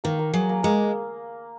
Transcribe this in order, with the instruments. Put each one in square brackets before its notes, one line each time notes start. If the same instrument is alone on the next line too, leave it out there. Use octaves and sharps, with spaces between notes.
[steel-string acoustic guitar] D#3 [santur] A#3
[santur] A#3
[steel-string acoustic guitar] F#3 [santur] G#4
[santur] A#3
[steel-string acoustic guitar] G#3 [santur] A#3